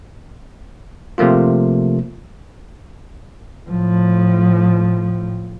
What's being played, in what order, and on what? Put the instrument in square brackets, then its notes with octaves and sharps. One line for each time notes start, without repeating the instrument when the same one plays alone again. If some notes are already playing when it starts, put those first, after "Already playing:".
[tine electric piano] C3 F3 A3 A#3 F4
[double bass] A2 F3